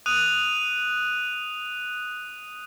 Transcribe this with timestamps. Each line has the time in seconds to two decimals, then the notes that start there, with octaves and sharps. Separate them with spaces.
0.06 D#6 F#6 D#7 F7